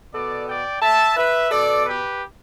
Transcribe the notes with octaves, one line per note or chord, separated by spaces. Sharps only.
B2 B3 A4 D5
D5 G5
E5 A5
B4 E5
B2 B3 A4 D5
G4 B4